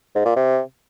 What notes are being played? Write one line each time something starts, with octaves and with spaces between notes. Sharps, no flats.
G#2
A#2
C3